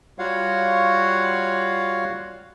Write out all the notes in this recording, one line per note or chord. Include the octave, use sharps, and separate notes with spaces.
G3 F4 F#4 C#5 F5 F#5